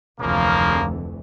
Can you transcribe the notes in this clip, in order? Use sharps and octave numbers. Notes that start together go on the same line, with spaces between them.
F1 D2 C#3 E3 F3 A#3